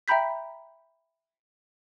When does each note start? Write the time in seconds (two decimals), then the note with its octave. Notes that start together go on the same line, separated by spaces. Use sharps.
0.08 E5 G5 A#5 B5 G6 B6